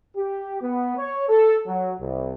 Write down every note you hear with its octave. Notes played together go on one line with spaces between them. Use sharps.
G4
B3
C#5
A4
F#3
C2